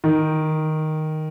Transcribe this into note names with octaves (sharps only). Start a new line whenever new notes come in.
D#3